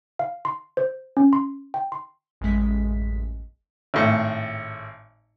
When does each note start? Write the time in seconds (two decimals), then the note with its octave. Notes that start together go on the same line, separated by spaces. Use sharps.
0.19 F5
0.45 C6
0.77 C5
1.17 C#4
1.33 C6
1.74 G5
1.92 C6
2.41 A1 F#2 G#3 B6
3.94 G#1 A2